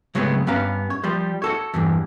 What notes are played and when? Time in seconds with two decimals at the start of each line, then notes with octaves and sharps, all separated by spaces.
0.15 C#3 F#3 G#3 A3 B3 C4
0.47 G2 B3 C#4 F5 A#5
0.90 C#5
1.04 F3 G3 C5
1.42 F#4 A4 C#5
1.74 E2 G2 E3